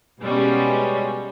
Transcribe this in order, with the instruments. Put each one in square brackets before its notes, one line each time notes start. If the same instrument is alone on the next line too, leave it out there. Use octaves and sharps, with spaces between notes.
[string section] B2 G3 G#3 C#4